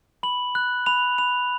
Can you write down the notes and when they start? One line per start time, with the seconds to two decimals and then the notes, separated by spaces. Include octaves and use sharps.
0.23 B5 F#7
0.55 F#6
0.86 B5 F7
1.18 B5 F7